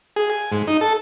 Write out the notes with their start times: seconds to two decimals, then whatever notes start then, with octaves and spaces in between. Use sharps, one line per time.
0.16 G#4
0.30 G#5
0.52 G#2
0.67 D#4
0.81 A4